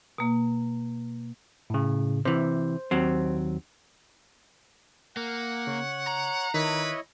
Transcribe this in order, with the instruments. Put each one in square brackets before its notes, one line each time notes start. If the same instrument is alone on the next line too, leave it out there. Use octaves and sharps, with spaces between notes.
[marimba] B2 A#3
[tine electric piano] A2 C#3
[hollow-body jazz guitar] C3 E3 [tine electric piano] C5
[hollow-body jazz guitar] D#2 F#3 C4
[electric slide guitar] A#3 [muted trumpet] F#5
[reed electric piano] C#3 [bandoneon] C#5
[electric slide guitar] A#5
[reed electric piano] D#3 [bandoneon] E4 C#5 D#5 [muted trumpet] B4